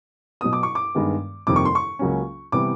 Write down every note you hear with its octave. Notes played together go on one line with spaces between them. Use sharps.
B2 F#3 B3 D#6
D6
C#6
D6
G2 D#3 G#3 B3
F2 C3 D#3 G3 A#3 D6
C#6
C6
C#6
C#2 C#3 F#3 A#3 C#4
C3 E3 G3 B3 D6